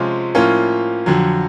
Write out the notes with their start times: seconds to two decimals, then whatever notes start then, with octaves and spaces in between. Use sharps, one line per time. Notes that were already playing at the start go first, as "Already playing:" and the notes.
Already playing: C3 F3 G#3 C#4 F4
0.35 A2 F3 A#3 C#4 F4
1.06 F2 D3 F#3